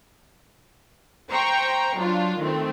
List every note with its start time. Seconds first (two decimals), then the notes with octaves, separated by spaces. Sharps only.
1.30 C5 G5 A#5 C#6
1.97 F#3 D4 F4
2.38 D#3 A3 C4